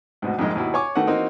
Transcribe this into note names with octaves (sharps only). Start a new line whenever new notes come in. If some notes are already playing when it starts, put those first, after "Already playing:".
D2 G#2 B2
C2 F2 A#2 D#3 G#3
D#2 B2 E4
C#5 G#5 C#6 D6
D#3 A3 B3 F#4 F#5
E3 A#3 C4 D#4 F#4